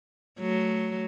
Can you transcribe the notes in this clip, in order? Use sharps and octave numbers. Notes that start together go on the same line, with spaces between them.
F#3 A3